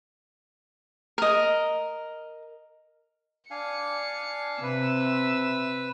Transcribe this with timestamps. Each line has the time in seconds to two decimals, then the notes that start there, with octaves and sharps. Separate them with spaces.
1.18 A#4 D#5
3.51 D4 F5 G#5 C#7
4.62 C3 B4 E5 E6